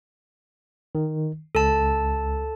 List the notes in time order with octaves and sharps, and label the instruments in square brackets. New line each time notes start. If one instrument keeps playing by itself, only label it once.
[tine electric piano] D#3
[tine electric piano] C#2 [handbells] A4 A5